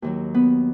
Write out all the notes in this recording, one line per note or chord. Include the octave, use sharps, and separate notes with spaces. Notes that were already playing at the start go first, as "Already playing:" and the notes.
D#2 D#3 F#3
B3